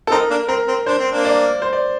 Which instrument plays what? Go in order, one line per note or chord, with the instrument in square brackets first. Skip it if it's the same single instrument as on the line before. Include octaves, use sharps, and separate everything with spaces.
[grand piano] A4
[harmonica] C4 D#4 [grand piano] A#4
[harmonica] A#3 D4
[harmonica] C4 [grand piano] A#4
[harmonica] C4
[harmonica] D4 [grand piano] C5
[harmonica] C4
A#3 D4
[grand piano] D5
C5
D5